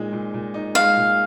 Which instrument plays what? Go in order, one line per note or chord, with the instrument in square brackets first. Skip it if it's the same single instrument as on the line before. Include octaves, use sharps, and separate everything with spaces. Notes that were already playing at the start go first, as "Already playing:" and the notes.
Already playing: [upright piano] A#2 G#3 D#4
A#2
A#2
D#4
[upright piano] G#3 [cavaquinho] F5
[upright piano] A#2